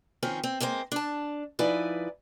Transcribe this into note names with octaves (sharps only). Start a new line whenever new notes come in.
D#3 F3 C4 C#4
C4
G#3 A#3 C4 C5
D4 A5
F3 D#4 E4 B4 D5 G#5